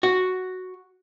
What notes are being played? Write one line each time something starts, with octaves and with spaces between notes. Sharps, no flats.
F#4